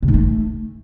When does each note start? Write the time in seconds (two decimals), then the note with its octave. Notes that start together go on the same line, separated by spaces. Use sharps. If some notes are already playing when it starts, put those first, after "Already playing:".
0.02 C3
0.08 G#2
0.14 A3